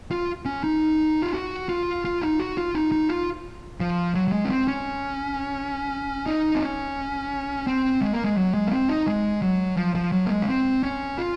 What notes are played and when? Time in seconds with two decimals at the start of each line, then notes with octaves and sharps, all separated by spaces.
0.11 F4
0.45 C#4
0.64 D#4
1.22 F4
1.34 F#4
1.69 F4
2.05 F4
2.22 D#4
2.40 F#4
2.57 F4
2.75 D#4
2.92 D#4
3.09 F4
3.80 F3
4.15 F#3
4.28 F#3
4.32 G#3
4.44 C#4
4.50 C4
4.68 C#4
6.26 D#4
6.55 C4
6.61 C#4
7.67 C4
8.01 G#3
8.13 A#3
8.24 G#3
8.37 F#3
8.54 G#3
8.67 A#3
8.72 C4
8.89 D#4
9.07 G#3
9.42 F#3
9.77 F3
9.95 F3
10.12 F#3
10.26 A#3
10.30 G#3
10.42 C#4
10.48 C4
10.83 C#4
11.18 F4